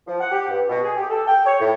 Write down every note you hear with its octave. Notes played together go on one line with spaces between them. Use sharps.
F3
F#5
G4
G2
B2
G#4
G4
A4
G5
C#5
A2